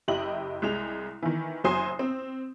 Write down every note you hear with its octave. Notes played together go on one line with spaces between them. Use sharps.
F#1 E4 G4 D#5 F#7
C2 G#3 F7
D#3 E3
F#1 F#3 C5 G#5 D#6 C7
C4